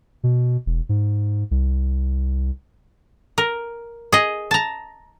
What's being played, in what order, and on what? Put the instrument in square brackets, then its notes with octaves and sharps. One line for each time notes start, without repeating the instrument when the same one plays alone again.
[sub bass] B2
E1
G#2
C2
[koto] A#4
G#4 D#5
A5 A#5